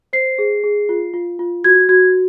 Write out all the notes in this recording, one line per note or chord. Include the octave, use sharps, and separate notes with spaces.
C5 C7
G#4
G#4
F4
F4
F4
F#4 G#6
F#4 G#6